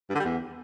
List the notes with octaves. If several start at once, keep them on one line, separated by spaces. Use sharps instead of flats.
G2
D3
G3
E2